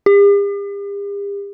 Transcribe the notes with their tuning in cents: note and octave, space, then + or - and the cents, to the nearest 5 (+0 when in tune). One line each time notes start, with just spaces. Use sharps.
G4 +45